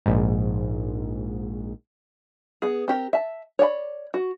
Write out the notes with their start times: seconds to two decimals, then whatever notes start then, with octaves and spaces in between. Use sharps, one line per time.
0.06 A#1 G#2
2.62 B3 G#4
2.88 C4 G4 A#4
3.13 E5 A5
3.59 C#5 D5 G5 B5
4.14 F#4